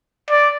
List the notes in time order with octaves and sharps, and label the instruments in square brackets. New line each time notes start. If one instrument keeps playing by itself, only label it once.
[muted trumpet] D5